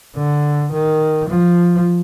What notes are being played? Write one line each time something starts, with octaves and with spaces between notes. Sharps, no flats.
D3
D#3
F3